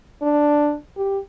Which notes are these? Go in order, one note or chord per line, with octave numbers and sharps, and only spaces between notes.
D4
G4